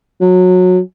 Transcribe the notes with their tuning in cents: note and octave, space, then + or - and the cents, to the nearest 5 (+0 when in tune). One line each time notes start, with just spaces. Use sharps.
F#3 -20